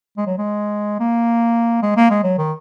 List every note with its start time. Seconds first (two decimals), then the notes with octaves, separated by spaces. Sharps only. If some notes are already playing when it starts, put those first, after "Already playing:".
0.17 G#3
0.27 F#3
0.38 G#3
1.00 A#3
1.82 G#3
1.96 A#3
2.10 G#3
2.24 F#3
2.38 D#3